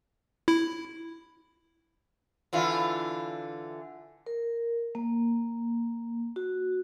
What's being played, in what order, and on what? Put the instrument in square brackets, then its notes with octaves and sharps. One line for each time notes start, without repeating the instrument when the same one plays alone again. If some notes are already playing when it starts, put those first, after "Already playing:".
[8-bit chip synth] E4
[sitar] D3 E3 F4
[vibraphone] A#4
A#3
F#4